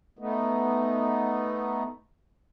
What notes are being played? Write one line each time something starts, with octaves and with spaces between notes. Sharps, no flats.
A3 B3 D#4